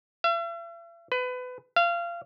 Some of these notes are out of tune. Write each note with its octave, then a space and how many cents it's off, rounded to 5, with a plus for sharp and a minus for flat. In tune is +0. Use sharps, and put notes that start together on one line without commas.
E5 +45
B4 +25
F5 -25